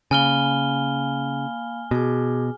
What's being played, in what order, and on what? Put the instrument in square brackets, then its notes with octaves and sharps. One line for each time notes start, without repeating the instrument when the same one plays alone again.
[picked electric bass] C#3 [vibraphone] A#3 F5 B5 [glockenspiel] G#5 F6 G7
[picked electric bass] B2 [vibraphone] F#4 G#4 D6